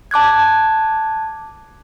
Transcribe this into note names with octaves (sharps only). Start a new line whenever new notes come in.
A5 D6 F#6 G#6